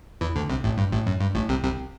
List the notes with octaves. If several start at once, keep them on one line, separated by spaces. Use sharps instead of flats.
E2 E3
D2 D3
C2 C3
A1 A2
G2
A1 A2
F#2
G2
A1 A2
C2 C3
C2 C3